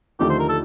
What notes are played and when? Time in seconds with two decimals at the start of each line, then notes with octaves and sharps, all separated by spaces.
0.19 D#2 D3 F3 A3 D#4 G4
0.29 C5
0.39 A#4
0.49 A4